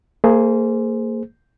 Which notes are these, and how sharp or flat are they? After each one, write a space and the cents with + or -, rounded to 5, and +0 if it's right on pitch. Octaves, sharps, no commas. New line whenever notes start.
A#3 -35 G#4 +10 C5 -5